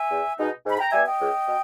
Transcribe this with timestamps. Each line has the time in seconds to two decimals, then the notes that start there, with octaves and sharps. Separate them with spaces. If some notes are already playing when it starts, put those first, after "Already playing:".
Already playing: E5 G#5
0.11 E2
0.38 B2 G#3 D#4
0.65 G#2 B5
0.79 G5 A#5
0.92 G3 B3 E5 G#5
1.06 D#5 G5
1.20 C#2
1.47 B2